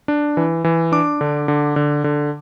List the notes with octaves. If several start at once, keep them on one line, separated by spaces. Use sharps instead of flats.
D4
E3
E3
D4 D6
D3
D3
D3
D3